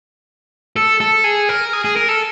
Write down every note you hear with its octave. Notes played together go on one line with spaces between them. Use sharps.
A4
A4
G#4
A#4
G#4
G#4
A#4
A4